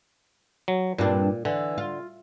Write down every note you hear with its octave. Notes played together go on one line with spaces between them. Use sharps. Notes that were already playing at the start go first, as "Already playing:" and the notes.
F#3
G2 A#2 C4 D4
D3 E3
F4